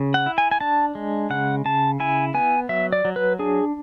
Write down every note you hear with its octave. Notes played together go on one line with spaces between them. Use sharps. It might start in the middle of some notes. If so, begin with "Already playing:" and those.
Already playing: C#3
F#5
E4
G#5
G#5
D4 A5
G#3
C#3 F#5
C#3 A5
E4 G#5
B3 G#5
F#3 E5
D5
F#3
B4
D4 G#4